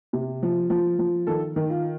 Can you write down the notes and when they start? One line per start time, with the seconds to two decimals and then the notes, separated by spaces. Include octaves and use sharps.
0.13 C3
0.43 F3
0.70 F3
0.99 F3
1.27 D#3 A4
1.56 D#3
1.69 F4